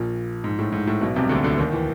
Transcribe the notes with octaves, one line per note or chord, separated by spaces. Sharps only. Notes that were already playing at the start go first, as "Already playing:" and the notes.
Already playing: A#1 A#2
G#2
A2
G#2
A2
B1 B2
C2 C3
D2 D3
D2 D3
D#2 D#3
E3